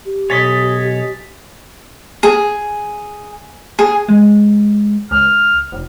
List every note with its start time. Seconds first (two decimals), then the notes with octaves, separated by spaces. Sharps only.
0.05 G4
0.30 B1 C#5 D#5 G#5 A6 B6
2.23 G#4
3.79 G#4
4.09 G#3
5.11 C#2 F6
5.72 F1